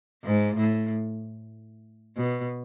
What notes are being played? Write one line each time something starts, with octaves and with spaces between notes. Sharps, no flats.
G#2
A2
B2